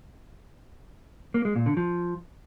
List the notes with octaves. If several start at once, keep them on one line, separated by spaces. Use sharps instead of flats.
A#3
G#3
A#2
D3
F3